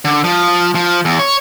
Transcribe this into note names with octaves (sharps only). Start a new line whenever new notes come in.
D3
F3
F3
E2
C#5